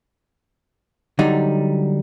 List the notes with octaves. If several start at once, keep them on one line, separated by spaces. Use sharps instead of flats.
D3 F#3 G3 D#4